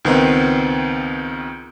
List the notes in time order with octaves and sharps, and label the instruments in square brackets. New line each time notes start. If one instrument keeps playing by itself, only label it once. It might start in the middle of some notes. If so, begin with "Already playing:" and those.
[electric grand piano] C#2 D#3 B3 C4